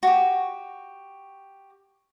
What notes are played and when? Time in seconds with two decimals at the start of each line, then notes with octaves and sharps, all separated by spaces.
0.03 F#4 G4